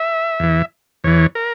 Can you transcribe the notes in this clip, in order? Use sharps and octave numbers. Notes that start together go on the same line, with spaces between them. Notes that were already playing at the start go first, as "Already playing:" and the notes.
Already playing: E5
E2 E3
E2 E3 C#5
A#4